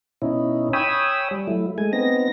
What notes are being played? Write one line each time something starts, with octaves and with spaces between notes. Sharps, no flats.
B2 C#4 D#4 E4
C#5 G5 G#5 B5 D#6 E6
G3
F#3 A3 E4
G#3 A3 G#5
B3 C4 D#4 A#6